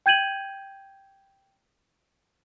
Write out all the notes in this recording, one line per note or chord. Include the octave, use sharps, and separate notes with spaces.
G5 G6 G#6 D#7 F#7